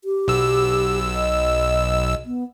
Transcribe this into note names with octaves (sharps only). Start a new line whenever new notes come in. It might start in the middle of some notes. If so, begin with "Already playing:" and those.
G4
B1 E6
D#5
B3